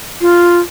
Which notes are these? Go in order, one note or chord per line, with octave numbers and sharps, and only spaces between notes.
F4